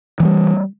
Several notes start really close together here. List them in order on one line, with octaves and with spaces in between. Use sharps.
E3 A3 G3